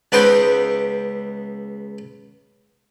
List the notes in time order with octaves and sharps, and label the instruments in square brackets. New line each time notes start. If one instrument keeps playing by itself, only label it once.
[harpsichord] C#2 B3 D#4 B4 C5 G5